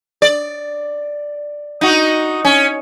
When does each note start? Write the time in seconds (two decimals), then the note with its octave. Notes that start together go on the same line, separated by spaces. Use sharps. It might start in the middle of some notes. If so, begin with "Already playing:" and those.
0.22 D5
1.81 D#4 F#4
2.45 C#4